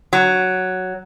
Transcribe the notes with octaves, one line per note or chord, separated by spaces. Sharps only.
F#3